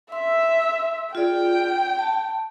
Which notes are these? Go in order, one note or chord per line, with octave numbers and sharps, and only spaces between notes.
E5 C6 E6
F4 G#4 D5 G5
A5